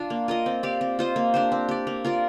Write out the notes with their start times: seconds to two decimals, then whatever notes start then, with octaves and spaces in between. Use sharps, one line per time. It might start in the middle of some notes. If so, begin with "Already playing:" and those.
Already playing: D4 F4
0.10 A#3
0.28 F4 A#4 D#5
0.46 C4
0.63 G4 D5 F5
0.81 C4
0.99 F4 C5 D#5
1.16 A#3
1.34 D4 G4 C5
1.52 C4
1.69 G4 D5
1.87 A#3
2.05 F4 A#4 D5